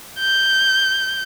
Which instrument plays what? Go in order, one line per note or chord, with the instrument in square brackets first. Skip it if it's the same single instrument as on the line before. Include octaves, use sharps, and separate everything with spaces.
[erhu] G6